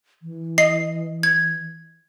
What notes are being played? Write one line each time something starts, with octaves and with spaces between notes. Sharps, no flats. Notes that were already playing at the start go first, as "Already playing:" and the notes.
E3
D#5 C7
G#6